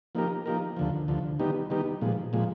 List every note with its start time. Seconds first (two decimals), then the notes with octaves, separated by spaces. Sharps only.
0.15 F3 A#3 D#4 G4 A#4
0.46 F3 A#3 D#4 G4 A#4
0.76 D2 D3 F3
1.08 D2 D3 F3
1.39 D#3 G3 B3 D#4 G4
1.70 D#3 G3 B3 D#4 G4
2.01 A#2 F3 G#3
2.33 A#2 F3 G#3